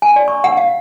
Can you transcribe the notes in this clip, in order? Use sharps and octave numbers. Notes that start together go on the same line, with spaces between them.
G#5
D5
C#6
F#5
F5